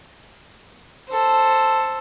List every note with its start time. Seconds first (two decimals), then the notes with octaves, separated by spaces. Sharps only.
1.09 A4 C5